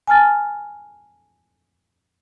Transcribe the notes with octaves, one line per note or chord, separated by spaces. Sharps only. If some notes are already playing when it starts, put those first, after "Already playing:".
G#5 A5 F6 A6